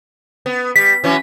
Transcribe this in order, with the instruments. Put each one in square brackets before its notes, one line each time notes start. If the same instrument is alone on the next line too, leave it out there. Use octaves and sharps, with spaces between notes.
[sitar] B3
[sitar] G3 [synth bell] B6
[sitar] E3 F#3 C#4